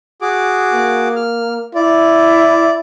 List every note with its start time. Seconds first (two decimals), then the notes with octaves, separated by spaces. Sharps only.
0.22 F#4 G#4 D6
0.73 A#3
1.16 F6
1.75 E4 D5